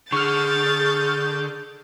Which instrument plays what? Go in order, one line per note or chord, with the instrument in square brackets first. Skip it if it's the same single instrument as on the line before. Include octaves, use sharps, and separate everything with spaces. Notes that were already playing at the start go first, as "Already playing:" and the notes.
[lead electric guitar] D3 [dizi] G#4 [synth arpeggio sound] C#6 F6 [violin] G6 A6